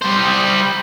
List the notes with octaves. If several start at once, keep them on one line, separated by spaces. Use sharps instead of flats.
G3 C5